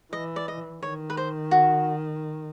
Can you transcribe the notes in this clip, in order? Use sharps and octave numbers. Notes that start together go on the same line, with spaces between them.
E3 D#5
D5
D#5
D#3 C#5
B4
C5
F#4